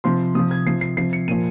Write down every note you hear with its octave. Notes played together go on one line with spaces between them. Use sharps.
C3 F3 C6
C3 F3 D#6
G#6
C3 F3 C7
C7
C3 F3 C7
C#7
A#2 F3 D#7